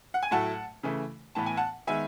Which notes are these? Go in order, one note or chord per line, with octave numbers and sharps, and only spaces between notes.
F#5
G#5
A2 F#3 A3 F#5 A5
C#3 E3 A3
A2 E3 B3 A5
G#5
F#5 A5
D#3 G#3 B3 E5 G#5